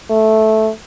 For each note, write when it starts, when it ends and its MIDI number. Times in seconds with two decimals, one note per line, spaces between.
0.10 0.70 57